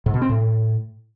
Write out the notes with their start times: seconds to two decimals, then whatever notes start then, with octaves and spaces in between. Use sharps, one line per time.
0.06 G#2
0.14 B2
0.22 C4
0.29 A2